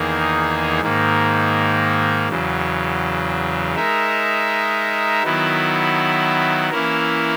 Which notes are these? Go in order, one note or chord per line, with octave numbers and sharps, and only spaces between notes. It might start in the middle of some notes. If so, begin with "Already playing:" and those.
Already playing: E2 D#3 A#3 D#4 G#4
G#2 D#3 A#3
E2 C#3 F#3
G#3 D#4 A#4 E5
D#3 F#3 B3 E4
E3 A#3 C#4 E4 A#4